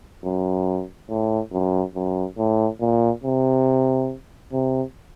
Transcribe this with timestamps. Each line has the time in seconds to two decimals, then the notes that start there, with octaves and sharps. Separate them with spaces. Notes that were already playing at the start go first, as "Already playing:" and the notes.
0.24 F#2
1.10 A2
1.52 F#2
1.95 F#2
2.38 A2
2.80 A#2
3.24 C3
4.52 C3